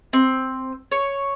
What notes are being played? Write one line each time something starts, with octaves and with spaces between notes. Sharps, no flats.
C4
C#5